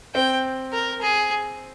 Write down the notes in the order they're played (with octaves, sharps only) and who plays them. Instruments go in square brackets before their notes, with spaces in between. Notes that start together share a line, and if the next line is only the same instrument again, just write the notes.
[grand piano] C4 [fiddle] G5
[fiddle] A#4
G#4